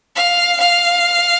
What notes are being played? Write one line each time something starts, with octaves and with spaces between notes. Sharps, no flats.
F5
F5